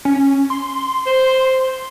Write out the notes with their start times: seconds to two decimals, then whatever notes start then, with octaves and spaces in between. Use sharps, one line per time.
0.05 C#4
0.50 C6
1.07 C5